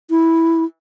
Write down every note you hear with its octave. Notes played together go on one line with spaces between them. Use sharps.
E4